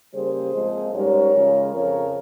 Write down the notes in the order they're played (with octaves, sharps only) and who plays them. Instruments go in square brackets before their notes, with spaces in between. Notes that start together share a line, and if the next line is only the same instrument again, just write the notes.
[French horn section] C#3 G3 A#3 G#4 C5
A#2 F3 G#3 C4
G#2 G3 C#4 A#4 C#5
C#3 F3 G#3
F2 C#3 F3 A#4 C#5